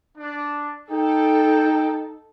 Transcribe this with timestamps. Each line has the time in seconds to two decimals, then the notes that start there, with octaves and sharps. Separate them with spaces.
0.18 D4
0.91 D#4 A4 G5